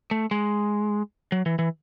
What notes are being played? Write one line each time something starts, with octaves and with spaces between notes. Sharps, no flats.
A3
G#3
F#3
E3
E3